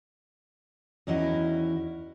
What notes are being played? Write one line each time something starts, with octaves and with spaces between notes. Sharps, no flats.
E2 D#3 C#4 E4 F#4 D#5